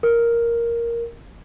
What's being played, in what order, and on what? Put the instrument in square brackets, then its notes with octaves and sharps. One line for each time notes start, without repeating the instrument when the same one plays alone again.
[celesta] A#4